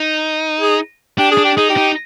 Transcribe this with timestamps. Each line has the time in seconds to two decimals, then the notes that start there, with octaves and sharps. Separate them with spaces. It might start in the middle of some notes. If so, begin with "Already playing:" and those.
Already playing: D#4
0.60 G#4
1.18 D4 G4
1.31 G#4
1.38 D4
1.44 G4
1.56 D#4 G#4
1.69 G4
1.77 D#4